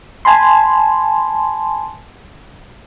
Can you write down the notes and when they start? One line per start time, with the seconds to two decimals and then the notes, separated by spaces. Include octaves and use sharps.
0.25 G#5 A5 B5 C6